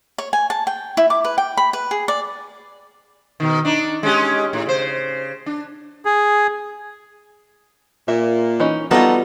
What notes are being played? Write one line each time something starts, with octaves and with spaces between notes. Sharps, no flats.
C#5
G#5
A5
G5
E4
D6
B4
G5
B5
B4
G#4
D5
B2 D#3
D4 D#4
G#3 C#4 G4
A2
C#3 C5
D4
G#4
A#2 E5
E3 C#4 D#4
G3 B3 D#4 F4 F#4 A4 D#5